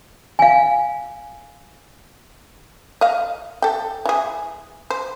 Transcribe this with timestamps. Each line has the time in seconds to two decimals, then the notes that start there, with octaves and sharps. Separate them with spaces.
0.39 F5 G#5
3.01 D#5 F5
3.62 A4 G5
4.06 E3 G#4
4.90 C5